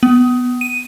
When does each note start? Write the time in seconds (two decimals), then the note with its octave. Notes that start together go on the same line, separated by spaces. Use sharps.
0.03 B3
0.61 D#7